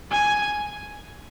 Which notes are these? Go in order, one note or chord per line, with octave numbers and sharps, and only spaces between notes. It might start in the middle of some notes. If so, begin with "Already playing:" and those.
G#5